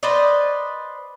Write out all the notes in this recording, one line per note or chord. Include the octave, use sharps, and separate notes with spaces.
B4 C5 D5 D#5